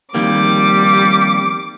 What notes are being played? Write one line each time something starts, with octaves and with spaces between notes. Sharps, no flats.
F2 D#3 G3 A#3 D6